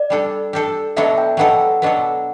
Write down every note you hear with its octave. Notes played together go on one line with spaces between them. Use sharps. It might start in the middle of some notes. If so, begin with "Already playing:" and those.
Already playing: D5
G3 D4 A4
G3 D4 A4
B2 F#3 B3 D4 A4 E5
G5
B2 F#3 B3 D4 A4 F#5
B2 F#3 B3 D4 A4